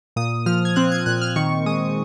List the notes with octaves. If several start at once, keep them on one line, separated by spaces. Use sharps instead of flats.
A#2 D#6
F3 F6
G#6
C4 F#6
G#6
A#2 F#6
F6
D#3 C#6
G#3 D#6